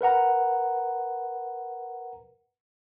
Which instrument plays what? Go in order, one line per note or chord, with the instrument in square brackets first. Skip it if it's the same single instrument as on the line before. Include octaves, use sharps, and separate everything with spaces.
[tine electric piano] A#4 B4 F#5 A#5